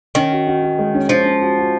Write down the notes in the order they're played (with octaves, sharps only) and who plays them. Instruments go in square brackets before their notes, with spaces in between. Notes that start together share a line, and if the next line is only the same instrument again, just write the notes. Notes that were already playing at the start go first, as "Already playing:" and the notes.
[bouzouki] D#3 [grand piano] C#4
[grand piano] F#4
F#4
F#4
G#3
C#4
[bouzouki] F3 [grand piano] C#4
[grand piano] C#4
F#4
F#4